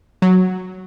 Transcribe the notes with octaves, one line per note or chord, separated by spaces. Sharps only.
F#3